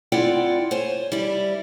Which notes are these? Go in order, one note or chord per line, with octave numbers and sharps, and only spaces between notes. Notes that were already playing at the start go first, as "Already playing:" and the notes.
C4 E4 F4 D5 F#5 G5
C5 C#5 G#5
G3 E4 D5